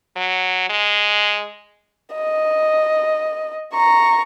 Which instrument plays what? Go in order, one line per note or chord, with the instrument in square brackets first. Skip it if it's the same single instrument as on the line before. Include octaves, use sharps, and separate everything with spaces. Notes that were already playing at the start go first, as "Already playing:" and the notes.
[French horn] F#3
G#3
[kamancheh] D#5
A#5 C#6